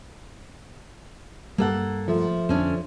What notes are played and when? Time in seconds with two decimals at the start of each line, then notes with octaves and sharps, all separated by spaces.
1.58 G2 G3 A#3 A4 F#5
2.08 F3 A3
2.49 F2 D3 C#4 D4